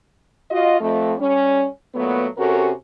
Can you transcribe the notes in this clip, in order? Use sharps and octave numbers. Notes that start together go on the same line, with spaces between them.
F4 F#4 D#5
F2 A3
G3 C#4
A#2 F#3 A3 B3
C3 C#4 F#4 G4 A4 A#4